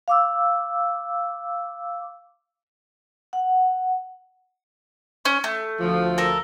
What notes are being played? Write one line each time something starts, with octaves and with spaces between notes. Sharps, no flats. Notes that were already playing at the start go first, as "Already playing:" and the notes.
F5 D6 E6
F#5
C#4
A3
D2 F3
A4 A#4